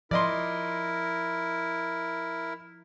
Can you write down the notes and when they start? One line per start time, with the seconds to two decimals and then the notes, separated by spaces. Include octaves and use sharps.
0.11 F3 E4 A#4 D5 D#5 C6